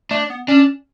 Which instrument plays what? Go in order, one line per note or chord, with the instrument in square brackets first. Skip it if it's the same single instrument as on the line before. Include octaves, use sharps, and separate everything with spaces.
[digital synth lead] A3 [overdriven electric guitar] D4
[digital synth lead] B3
[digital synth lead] C#4 [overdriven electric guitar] D4